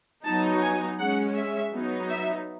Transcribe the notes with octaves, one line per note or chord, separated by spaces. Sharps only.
F#3 B3 D#4 A5
G#5
G#3 C#4 F#5
E5
F#3 B3 D#4
E5